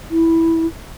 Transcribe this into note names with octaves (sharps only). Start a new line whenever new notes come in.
E4